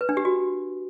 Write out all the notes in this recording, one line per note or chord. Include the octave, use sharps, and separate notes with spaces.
B4
D4
G4
F#4